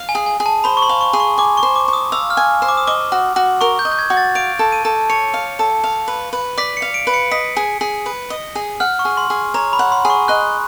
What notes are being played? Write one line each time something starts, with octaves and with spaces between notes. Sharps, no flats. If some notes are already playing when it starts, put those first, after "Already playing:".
Already playing: F5
G#5
G#4
G#5
G#4
A5
C5 B5
C#6
C6
F5
C#6
G#4
C#6
G#5 D6
C#6
C5
D6
C#6
D#6
F5 E6
F6
G#5
C5
D6
D#6
D#5 D6
F#4
F#4
A#4 C#6
G6
D#5
G6
G#6
F#4
A6
F5 D7
A4
D#7
A4
C#5 C#7
F5
A4
F5
B4
B4
D5 B6
C#7
F5
D7
B4
C#7
D#5 B6
G#4
G#4
B4
D#5
G#4
F#5 F6
C#6
G#4
C6
G#4
C#5 A#5
B5
F#5
C6
G#4
C#6
D#5 F#6